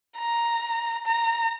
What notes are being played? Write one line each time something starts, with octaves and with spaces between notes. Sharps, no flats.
A#5
A#5